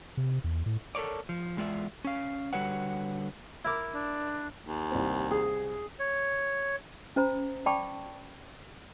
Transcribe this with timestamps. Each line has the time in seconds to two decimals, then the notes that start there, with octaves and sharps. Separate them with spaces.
0.17 C3
0.44 E2
0.66 A2
0.95 A4 A#4 C#5 D5
1.29 F3
1.57 E2 G#3 F4 D5 E5
2.05 C#4 F5
2.53 D3 G3 F#4 B4 C#5 F#5
3.65 E4 A#4 D6
3.93 D4
4.65 D#2
4.91 C2 C4
5.31 G#4
5.99 C#5
7.16 C#4 C5 A#5 B5
7.66 D5 G5 A5 B5 C#6 D6